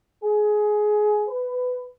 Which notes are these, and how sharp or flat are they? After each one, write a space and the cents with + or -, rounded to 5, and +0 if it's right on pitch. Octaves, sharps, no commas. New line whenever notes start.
G#4 +20
B4 +15